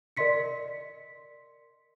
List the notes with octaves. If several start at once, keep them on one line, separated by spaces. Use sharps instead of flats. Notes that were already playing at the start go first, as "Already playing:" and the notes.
A#4 D5 D#5 C6 B6 C#7